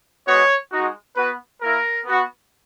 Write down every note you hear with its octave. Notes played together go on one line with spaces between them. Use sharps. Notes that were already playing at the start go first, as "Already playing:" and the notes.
G#3 B3 F#4 C#5
G#3 D#4 F#4
B3 F#4 B4
A#3 E4 A#4
B3 F#4